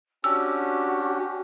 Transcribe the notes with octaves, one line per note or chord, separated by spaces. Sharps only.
C#4 D4 F#4 G4 E6